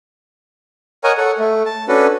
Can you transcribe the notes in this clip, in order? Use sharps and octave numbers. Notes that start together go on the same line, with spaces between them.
A#4 C#5 D#5 F#5 G#5 A#5
A4 C#5 F#5
A3
A5
C#4 D4 F#4 A4 B4